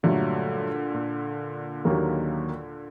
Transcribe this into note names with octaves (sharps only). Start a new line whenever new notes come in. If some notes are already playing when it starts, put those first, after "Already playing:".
G2 A#2 D3 F#3 A3
A#2
D#2 D#3 F#3 A#3